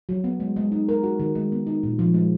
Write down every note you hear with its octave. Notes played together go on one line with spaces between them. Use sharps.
F#3
B3
G#3
G#3
D#4
A#4
F#4
D#3
G#3
B3
D#4
A#2
F3
G#3